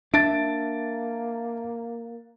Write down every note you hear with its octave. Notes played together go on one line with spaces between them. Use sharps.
A#3 D4 E5 A5 A6 D7